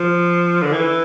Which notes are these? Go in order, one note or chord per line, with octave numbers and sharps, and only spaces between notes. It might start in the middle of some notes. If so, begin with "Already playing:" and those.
Already playing: F3
D3
E3